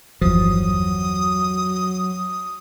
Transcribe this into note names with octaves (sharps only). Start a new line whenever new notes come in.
G1 E2 F3 F#3 D#6